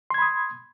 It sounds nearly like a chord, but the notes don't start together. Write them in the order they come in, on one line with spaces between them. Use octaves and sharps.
C6 G#6 B5 D#6